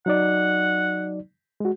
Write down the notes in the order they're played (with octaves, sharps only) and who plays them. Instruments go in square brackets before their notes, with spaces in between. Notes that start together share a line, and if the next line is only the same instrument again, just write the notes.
[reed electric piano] F#3 D#4 D5 [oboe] F#5
[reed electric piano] G#3 F#4